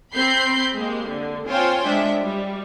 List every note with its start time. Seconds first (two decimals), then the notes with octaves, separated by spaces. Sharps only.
0.13 C4 B5 G6 C7
0.75 G#3 A#3 G4
1.08 D3
1.47 C4 F4 C5 C#5 G5 G#5
1.86 G#3 D4 E5
2.23 G3